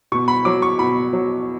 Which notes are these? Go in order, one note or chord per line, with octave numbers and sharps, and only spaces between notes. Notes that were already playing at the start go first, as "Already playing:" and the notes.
B2 C#6
B5
F#3 D6
C#6
B2 B5
F#3